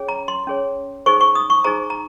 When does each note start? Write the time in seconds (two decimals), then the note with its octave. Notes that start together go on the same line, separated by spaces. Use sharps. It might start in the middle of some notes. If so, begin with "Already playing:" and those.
Already playing: C#4 G#4 C#5
0.08 A#5
0.28 C6
0.47 C#4 G#4 C#5
1.06 D#4 G#4 C5 C#6
1.21 C#6
1.35 D#6
1.50 C#6
1.64 D#4 G#4 C5 A#5
1.90 A#5